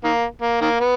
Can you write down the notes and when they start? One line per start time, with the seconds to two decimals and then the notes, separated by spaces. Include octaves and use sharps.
0.04 D#3 A#3
0.42 A#3
0.61 D#3 A#3
0.80 B3